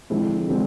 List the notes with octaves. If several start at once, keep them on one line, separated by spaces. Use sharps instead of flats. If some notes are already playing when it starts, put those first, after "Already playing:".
D3 F3 G#3 C4 E4
D3 F3 G#3 C4